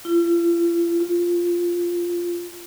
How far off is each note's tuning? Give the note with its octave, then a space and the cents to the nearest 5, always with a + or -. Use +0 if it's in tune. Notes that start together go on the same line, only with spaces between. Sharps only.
F4 -45
F4 -5